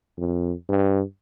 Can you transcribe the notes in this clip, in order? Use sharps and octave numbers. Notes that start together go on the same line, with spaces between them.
F2
G2